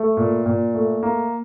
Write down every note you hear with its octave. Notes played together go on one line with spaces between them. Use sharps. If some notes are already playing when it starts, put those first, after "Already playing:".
Already playing: A3
A#2
A#2
A3
A#3